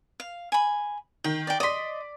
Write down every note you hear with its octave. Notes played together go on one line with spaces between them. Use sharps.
F5
G#5 B5
D#3 G5
D5 G5
D5 D#5 C6 B6